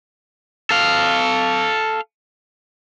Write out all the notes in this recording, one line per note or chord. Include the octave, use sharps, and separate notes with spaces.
A4 F5